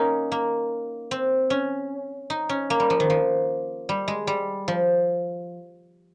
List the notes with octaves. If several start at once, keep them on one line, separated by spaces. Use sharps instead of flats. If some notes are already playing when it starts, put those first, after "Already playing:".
Already playing: A#3 C#4 D#4
A#3
C4
C#4
D#4
C#4
A#3
G3
F3
D#3
F3
G3
G#3
G3
F3